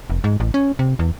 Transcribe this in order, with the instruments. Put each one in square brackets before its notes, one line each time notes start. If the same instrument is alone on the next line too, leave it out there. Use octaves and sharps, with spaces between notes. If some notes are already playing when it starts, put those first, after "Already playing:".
[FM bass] F1
G#2
A1
C#4
C3
E2